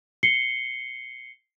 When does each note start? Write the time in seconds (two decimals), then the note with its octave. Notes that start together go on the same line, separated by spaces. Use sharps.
0.23 C7 C#7 G7